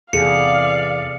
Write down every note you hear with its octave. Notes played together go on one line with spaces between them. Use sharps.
E2 C3 G#4 A4 D5 F5 C#7